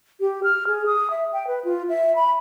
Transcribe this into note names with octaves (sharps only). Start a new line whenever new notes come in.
G4
F6
G#4
D#6
E5
G5
B4
F4
E5
B5